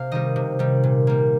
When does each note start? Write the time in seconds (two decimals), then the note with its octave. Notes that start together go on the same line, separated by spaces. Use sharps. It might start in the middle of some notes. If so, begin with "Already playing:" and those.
Already playing: C3 F5
0.11 D#3 G3 D#5
0.36 C3
0.59 D#3 G3
0.84 A#2
1.07 G3 A#3